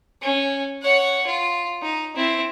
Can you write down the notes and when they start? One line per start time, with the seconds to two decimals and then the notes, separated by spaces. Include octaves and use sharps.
0.22 C#4
0.82 C#5 F#5
1.26 F4
1.82 D#4
2.16 C4 E4